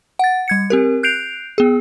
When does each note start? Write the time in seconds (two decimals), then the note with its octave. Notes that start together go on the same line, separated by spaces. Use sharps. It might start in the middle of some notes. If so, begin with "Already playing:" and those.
0.19 F#5 A6
0.48 G3 G#6 C#7
0.70 C4 G4 A#4
1.03 F#6 G6 C7 D7 F7
1.58 B3 G#4